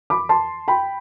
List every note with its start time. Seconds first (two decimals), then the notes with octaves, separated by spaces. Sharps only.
0.10 B5 D6
0.29 A5 C6
0.68 G5 B5